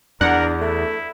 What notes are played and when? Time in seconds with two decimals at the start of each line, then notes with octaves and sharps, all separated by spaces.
0.21 E2 D4 A#4 F#5
0.61 A3 E4